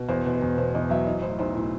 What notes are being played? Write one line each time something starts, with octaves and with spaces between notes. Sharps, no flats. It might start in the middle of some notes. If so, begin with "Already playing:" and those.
Already playing: B2
E2 C5
B2
B4
E2
B2 C5
E2 D#5
F#3 E5
E3 D#5
A2 C5
B1 C5
A2